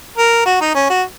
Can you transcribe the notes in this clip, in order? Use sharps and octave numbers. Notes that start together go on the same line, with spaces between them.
A#4
F#4
D#4
C#4
F#4